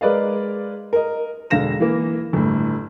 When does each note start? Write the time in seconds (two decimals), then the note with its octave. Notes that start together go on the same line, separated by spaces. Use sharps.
0.01 G#3 A#4 B4 D5 D#5 F5
0.93 A#4 D#5
1.50 E1 D3 F5 A#6 E7
1.80 E3 A#3
2.33 G1 A2